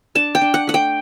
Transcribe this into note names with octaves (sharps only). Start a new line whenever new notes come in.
D4 A5
G5
D4
F#5
A3 F#5
G5